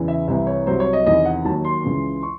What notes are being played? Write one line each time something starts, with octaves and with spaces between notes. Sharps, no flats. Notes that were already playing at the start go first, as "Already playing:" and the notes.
Already playing: E2 C#3 E3
E5
C2 C3 E3 E5
C#5
C2 C3 F#3 C5
C#5
D#5
E2 C3 D#3 D#5
F#5
D#2 D#3 F#3 A5
C6
C#2 C#3 E3
C#6